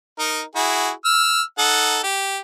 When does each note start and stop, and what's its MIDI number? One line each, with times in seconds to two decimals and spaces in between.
0.19 0.42 63
0.19 0.42 70
0.56 0.90 64
0.56 0.90 66
0.56 0.90 68
1.05 1.42 88
1.05 1.42 89
1.58 1.99 63
1.58 1.99 69
1.58 1.99 78
2.03 2.39 67